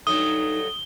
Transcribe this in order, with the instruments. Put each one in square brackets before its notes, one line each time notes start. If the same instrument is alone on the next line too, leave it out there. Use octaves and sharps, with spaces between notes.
[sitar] G2 F#3 A3 [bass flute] D#4 [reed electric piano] D#6 [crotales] G7